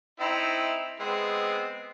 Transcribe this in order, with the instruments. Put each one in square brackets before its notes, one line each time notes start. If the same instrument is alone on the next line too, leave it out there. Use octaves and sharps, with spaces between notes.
[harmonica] C4 D#4 E4
G#3 B3 C4